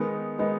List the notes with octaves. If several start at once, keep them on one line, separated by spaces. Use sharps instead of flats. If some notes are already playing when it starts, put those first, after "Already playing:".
Already playing: D#3 G#3 B3 D#4
D#3 G#3 B3 D#4